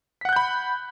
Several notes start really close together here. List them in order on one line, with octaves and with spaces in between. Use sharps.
B6 F#5 F#6 G6 B5